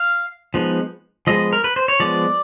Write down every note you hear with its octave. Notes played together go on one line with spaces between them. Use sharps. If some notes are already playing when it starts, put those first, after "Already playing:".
Already playing: F5
F3 G#3 B3 D#4
F3 G#3 B3 D#5
A#4
B4
C5
C#5
F3 G#3 B3 D5